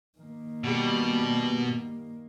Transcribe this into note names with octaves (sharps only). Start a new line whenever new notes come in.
D#3 A#3
B2 G3